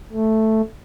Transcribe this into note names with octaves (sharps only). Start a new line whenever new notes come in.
A3